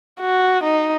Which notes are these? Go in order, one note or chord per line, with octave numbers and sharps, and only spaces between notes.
F#4
D#4